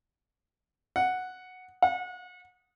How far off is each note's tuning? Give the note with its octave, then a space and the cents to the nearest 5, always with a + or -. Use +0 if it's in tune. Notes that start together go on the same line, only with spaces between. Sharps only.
F#5 -5
F#5 -35